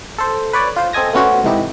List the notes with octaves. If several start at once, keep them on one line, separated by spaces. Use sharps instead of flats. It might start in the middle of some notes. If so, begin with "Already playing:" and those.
A4 C5
B4 C#5 D5
F4 C5
C4 A4 D#5 G#5 A#6
A3 B3 C#4 F#4 C5
G#2 C3 E3 D#4 E4 G4